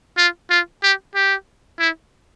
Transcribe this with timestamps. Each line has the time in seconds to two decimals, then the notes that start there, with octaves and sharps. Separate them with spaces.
0.18 F4
0.50 F4
0.83 G4
1.15 G4
1.79 E4